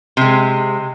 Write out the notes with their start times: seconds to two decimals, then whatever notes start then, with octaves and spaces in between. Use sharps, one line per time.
0.17 C3 G#3